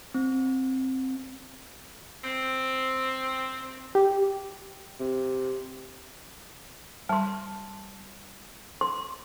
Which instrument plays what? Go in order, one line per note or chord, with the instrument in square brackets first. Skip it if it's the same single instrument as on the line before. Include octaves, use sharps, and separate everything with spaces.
[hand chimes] C4
[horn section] C4
[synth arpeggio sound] G4
[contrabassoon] C3
[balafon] G3 [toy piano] A5 C6
[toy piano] C6